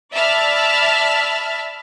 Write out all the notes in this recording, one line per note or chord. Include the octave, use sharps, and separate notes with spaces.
D5 E5 A5 B5 F6